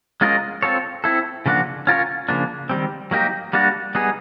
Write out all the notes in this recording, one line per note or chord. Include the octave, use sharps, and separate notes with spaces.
G#3 C#4 F4 A#4 D#5
C4 F4 A4 C#5
C4 E4 A4
C#3 F3 A#3 D4 F#4
C#4 F4 A#4 C#5
C#3 F3 A#3 D4
D#3 G3 C4
F#3 A#3 D#4 G4 A#4
G3 A#3 D4 F#4
G3 B3 D#4 G#4